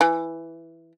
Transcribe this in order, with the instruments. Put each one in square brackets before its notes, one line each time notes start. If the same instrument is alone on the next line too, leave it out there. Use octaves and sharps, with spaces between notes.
[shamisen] E3